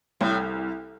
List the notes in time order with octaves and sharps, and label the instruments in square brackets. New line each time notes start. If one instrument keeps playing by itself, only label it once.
[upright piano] C2 [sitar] A2